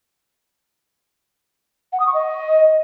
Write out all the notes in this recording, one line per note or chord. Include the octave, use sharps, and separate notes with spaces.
F#5
D#6
C#6
D#5